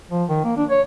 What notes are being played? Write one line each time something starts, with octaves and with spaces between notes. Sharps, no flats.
F3
D#3
A#3
D4
C#5